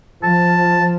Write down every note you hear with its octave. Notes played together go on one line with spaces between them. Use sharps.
F3 A5